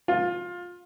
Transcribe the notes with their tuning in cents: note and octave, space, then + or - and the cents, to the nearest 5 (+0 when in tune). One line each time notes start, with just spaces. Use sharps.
F4 +15